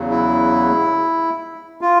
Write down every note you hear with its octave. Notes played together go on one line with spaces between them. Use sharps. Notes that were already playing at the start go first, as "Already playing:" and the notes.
Already playing: E2 C#3 F#3
E4
F4